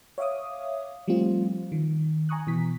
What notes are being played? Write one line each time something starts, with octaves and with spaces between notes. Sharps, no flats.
C#5 E5 F5 D6 D#6
F3 G3 A3 C4 F4
D#3
G#5 A#5 C#6 D#6 F#6
B2 E3 B6